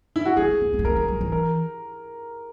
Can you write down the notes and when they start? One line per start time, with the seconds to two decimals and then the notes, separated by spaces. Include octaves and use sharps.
0.16 E4
0.25 F#4
0.37 G#3 G#4
0.61 B3
0.73 A#3
0.79 G#3
0.85 A#3 A#4
0.96 G#3
1.08 F#3
1.21 E3
1.32 A#4